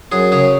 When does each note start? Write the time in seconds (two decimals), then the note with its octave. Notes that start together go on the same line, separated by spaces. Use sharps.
0.12 F#2 G#4
0.32 C#3 G#4